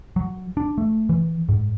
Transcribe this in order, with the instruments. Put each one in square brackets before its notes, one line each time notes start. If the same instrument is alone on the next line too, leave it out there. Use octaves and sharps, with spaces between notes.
[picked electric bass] F#3
D4
A3
E3
G#2